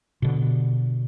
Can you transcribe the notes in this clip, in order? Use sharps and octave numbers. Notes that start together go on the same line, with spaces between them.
B2 D3